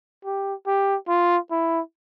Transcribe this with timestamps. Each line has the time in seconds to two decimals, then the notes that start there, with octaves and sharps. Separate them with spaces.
0.25 G4
0.67 G4
1.08 F4
1.51 E4